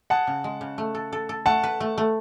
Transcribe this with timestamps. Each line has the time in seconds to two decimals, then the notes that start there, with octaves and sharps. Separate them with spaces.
0.10 G#4 F#5 A5
0.27 C#3
0.44 G#3
0.61 C#3
0.78 A3
0.95 A4
1.13 A4
1.29 A4
1.46 A3 F#5 A5
1.63 B4
1.80 A3
1.98 A3